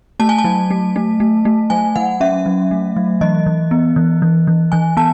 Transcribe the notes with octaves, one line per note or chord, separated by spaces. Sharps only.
A3 A5
G#5
A5
F#3
A3
A3
A3
A3
F#3 G#5
F#3 F#5
C#4 E5
F#3
A3
F#3
E3 D#5
E3
B3
E3
E3
E3
E3 G#5
B3 A5